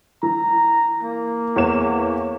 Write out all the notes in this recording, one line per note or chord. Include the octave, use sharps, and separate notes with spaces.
E3 A#5
A#3
E2 C#5 E7